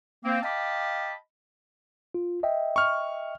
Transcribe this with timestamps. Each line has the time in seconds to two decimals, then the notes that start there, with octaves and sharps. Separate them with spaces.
0.24 A#3 C4
0.43 D#5 F5 G5 A5 B5 D6
2.14 F4
2.43 D#5 E5 G5
2.76 C#6 F6